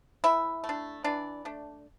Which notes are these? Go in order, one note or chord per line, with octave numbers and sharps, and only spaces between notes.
E3 E4 E5
A3
D4
E3 D4 D5
A3 D4